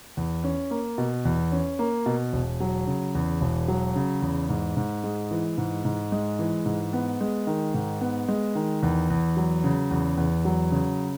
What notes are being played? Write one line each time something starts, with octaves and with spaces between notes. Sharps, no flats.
E2
C#4
A#3
B2
E2
C#4
A#3
B2
E1
F#3
C#3
E2
E1
F#3
C#3
E2
G#2
G#2
G#3
E3
G#2
G#2
G#3
E3
G#2
B3
G#3
D#3
G#2
B3
G#3
D#3
E2
E2
F#3
C#3
E2
E2
F#3
C#3